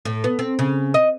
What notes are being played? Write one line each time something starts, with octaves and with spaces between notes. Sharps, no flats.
A2
B3
C4
C#3
D#5